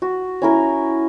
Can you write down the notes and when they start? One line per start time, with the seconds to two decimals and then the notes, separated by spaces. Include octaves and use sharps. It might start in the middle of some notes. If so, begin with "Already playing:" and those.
0.02 F#4
0.42 C#4 E4 A#4